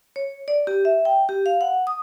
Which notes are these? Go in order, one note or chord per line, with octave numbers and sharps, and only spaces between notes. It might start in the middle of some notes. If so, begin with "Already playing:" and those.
C#5
D5
G4
E5
G5
G4
F5
F#5
D#6